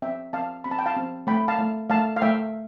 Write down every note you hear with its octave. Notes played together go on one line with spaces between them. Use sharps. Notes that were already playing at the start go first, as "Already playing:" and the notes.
C4 E5 G5
C4 F5 A5
C4 B5
A5
G5
F5 A5
C4
A3 G5 B5
F5 A5
A3
A3 F5 A5
F5
A3 E5 G5